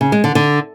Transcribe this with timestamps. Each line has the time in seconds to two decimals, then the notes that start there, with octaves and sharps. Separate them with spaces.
0.01 C#3
0.12 G#3
0.24 D3
0.35 D3